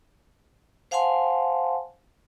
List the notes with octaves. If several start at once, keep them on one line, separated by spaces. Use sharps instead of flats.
C5 F5 F#5 G#5 A5 C6